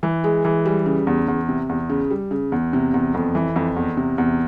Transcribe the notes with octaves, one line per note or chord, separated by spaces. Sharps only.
E3
G#3
E3
G3
C#3
E2
E2
C3
E2
C#3
G3
C#3
E2
C3
E2
F2
E3
F2
E2
C3
E2